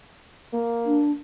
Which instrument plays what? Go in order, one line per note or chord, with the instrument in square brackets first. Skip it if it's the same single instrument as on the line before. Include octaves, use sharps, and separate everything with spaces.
[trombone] A#3
[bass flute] D4